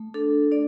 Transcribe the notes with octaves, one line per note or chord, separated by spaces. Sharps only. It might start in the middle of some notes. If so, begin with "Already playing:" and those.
Already playing: A3
D4 A4
D4 D5